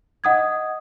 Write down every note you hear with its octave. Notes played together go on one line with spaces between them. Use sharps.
D#5 F#5 D#6 G#6